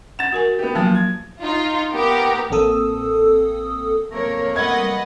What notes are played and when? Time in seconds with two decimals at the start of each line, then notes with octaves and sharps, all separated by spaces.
0.19 F#5 A6 E7
0.32 F#4 A#4 G#5
0.59 B3 G4
0.75 F3 F#3 A#3 G#5
0.95 G#6
1.41 D#4 F4
1.92 B3 G4 A#4
2.50 A1 A#3 C4 A4 D#6 E6
4.11 C3 A3 A#3 A#4 C#5
4.56 G3 B4 D#5 F#5 G#6